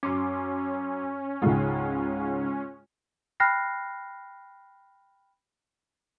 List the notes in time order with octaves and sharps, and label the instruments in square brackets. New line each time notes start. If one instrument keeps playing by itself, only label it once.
[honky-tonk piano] F#2 C6 D6 [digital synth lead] C#4
[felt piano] C#2 G#2 [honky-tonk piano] G#3 F4
[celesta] G5 B5 F6 F#6 A#6 C7